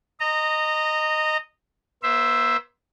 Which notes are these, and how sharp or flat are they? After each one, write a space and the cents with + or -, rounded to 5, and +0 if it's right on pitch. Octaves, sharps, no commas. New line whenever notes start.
D#5 -10 A#5 -20
B3 -45 C5 +0 E5 +5